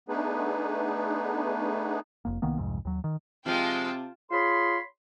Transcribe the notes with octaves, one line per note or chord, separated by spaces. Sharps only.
A3 B3 D4 D#4 G#4 B4
F1 A#3
C2 D#3 A#3 B3
C2 F2 G#2
D#2 F#3
D#3
C3 F3 G#3 F4 G5 A5
F4 G#4 C#5 B5 C6